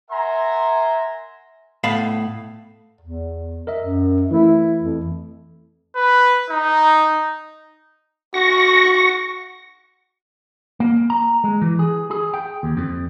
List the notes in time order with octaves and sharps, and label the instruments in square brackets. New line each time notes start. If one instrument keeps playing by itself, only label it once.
[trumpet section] A#4 E5 F#5 G#5 A#5 C6
[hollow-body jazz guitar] A2 B3 F5 A5 B5
[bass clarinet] E2
[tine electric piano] A#4 D#5 E5
[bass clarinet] F#2
[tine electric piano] E3 A3 [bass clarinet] E4
[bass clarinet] F2
[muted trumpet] B4
D#4
[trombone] F#4 [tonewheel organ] C#6 A#6
[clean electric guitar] A#3
A#5
G#3
E3
G#4
G#4
G5
D#2
F2